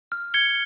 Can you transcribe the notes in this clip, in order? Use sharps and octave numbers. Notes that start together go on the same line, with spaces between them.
F6
G#6 C#7 G7